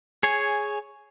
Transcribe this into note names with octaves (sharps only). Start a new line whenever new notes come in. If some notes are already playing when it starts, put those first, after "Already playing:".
G#4 C#5 G#5